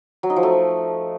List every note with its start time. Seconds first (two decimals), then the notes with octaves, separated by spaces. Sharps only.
0.23 F#3
0.30 D#4
0.36 F3
0.43 A3